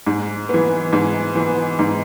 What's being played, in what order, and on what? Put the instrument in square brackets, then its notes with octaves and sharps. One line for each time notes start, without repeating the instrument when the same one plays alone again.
[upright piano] G#2
E3 B3
G#2
E3 B3
G#2